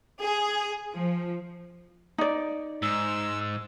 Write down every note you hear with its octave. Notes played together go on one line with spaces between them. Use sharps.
G#4
F3
D#4 D5
G#2 E6